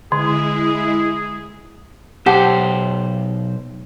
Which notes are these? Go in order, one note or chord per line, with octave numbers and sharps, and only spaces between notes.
D3 G#3 E4 G#4
B1 G4 C5 F#5 A5